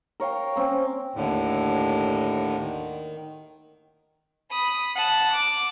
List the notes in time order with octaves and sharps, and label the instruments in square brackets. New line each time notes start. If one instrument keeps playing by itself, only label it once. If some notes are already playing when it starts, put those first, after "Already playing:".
[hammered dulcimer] A#4 C#5 F5 G5
A#3 C4 C#4
[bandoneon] D#2 A2 D3
D#3
[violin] B5 D#6
F#5 A5
D6